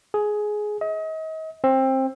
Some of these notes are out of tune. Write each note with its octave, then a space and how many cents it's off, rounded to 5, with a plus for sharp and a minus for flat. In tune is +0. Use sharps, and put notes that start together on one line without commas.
G#4 +15
D#5 +35
C4 +20